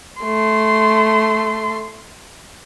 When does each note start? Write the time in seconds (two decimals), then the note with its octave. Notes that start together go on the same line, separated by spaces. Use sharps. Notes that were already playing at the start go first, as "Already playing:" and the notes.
0.22 A3 C6